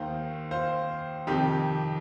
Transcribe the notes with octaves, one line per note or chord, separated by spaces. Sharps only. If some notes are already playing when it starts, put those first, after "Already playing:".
Already playing: D#2 D#3 C5 F5
C5 F5
F2 C3 D#3 G4